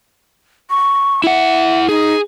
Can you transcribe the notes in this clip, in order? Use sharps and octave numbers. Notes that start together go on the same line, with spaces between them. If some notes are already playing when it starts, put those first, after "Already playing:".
C#6
E4 E5 F#5
D#4 G#4